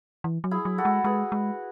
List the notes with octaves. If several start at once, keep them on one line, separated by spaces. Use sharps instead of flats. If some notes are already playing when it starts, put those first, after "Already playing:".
E3
F#3
E4 G#4
F#3
F#4 A4
G#3
G#3 G#4 B4
G#3